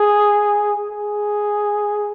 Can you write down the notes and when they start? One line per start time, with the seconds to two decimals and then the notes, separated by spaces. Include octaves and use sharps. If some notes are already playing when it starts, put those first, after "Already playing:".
Already playing: G#4
0.90 G#4